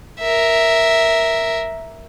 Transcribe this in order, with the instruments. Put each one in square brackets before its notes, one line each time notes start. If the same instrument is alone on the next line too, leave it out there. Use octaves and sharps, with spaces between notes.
[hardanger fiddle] A#4 E5